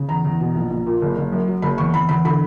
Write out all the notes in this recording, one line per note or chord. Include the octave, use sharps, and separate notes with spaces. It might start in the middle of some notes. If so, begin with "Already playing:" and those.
Already playing: C#3
E2 A#5
E2
B2
A#1
A#1
A#2
F#1
F#1
F#2
F#3
F#1 B5
E2 C#6
E2 B5
E2 B5
D3 B5